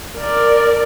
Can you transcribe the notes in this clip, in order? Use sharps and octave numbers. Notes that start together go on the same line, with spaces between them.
A#4 D5